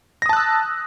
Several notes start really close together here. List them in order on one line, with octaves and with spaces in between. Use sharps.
A#6 D#6 A5 F#6 E6